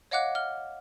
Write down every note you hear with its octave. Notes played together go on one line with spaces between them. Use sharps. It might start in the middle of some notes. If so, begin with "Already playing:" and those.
C#5 D#5 F5 F#5 D6 F#6
F6 G7